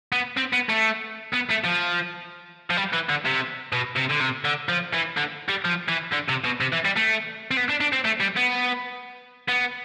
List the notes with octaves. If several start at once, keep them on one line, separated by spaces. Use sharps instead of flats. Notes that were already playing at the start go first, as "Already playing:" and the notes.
B3
C4
B3
A3
B3
A3
F3
F3
G3
E3
D3
C3
B2
C3
D3
C3
D3
F3
E3
D3
G3
F3
E3
D3
C3
B2
C3
E3
G3
A3
C4
B3
D4
D4
C4
A3
G3
B3
B3